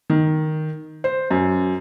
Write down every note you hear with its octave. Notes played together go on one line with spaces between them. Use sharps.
D#3
C5
F#2